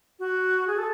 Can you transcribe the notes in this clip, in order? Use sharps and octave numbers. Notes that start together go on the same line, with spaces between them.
F#4
G#4
A4